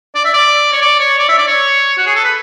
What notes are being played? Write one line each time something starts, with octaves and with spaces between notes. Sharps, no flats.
D5
E5
D5
C#5
D5
C#5
D5
E5
D5
C#5
F#4
G#4
A4
B4